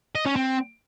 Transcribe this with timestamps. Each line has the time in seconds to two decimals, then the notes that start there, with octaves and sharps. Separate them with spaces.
0.15 D#5
0.26 C#4
0.36 C4